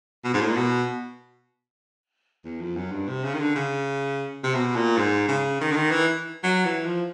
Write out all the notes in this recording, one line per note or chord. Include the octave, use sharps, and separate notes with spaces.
B2
G#2
A2
A#2
B2
E2
F2
F#2
G2
C3
C#3
D#3
D3
C#3
C3
B2
A#2
G#2
C#3
D#3
D3
D#3
E3
F#3
E3
F3